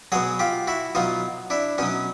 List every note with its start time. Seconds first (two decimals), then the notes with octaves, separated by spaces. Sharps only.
0.12 B2 F#3 F#4 G#4
0.39 F4 G4
0.67 E4 F#4
0.95 B2 F#3 D#4 F4
1.50 D4 E4
1.78 B2 F#3 C#4 D#4